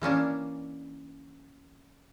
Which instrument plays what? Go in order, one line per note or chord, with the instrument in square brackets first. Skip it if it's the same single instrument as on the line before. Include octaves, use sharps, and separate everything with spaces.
[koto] E3 A#3 C#4 D4